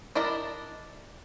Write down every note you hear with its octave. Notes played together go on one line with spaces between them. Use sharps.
D4 E4 A#4 D5 D#5